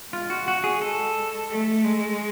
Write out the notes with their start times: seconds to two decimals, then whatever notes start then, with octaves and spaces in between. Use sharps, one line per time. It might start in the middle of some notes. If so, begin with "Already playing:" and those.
0.13 G#3 F4
0.30 F#4
0.48 F#4
0.64 G#4
0.82 A4
1.50 A3
1.84 G#3